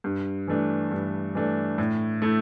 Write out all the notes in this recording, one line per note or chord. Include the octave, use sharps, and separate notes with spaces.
G2
E3 A3 D4
G2
E3 A3 D4
A2
A3 E4